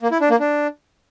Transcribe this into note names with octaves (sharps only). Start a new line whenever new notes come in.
A#3
E4
D4
A#3
D4